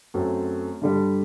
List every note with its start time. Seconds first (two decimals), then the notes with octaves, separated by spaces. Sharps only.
0.14 F#2 F#3 A3 C4
0.82 G2 D3 G3